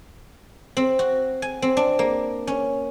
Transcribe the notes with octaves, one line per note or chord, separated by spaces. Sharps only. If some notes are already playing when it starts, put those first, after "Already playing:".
C4
F#4
G#5
C4
D4
A#3
C#4